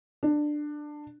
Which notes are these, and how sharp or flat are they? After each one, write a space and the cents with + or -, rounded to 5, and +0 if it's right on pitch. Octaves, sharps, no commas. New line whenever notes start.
D4 +15